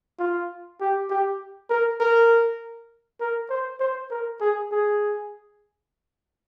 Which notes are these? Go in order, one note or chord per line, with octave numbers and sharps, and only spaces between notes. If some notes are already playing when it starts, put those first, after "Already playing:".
F4
G4
G4
A#4
A#4
A#4
C5
C5
A#4
G#4
G#4